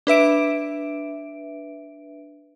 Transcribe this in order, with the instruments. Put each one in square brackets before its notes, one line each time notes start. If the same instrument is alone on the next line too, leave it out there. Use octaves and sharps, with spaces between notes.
[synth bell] D4 B4 E5 D7